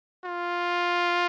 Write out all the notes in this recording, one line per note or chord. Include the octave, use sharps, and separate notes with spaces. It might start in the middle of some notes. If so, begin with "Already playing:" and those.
F4